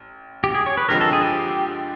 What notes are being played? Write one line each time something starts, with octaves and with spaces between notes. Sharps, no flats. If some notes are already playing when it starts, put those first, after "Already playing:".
Already playing: A1
G4
G#4
C#5
B4
G2 D3 F3 G#3 C4 A#4
A4
G#4
G4